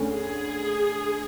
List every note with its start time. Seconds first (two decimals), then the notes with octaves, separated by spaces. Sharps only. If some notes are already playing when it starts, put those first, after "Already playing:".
Already playing: D2 D3 A3 C#4
0.11 G#4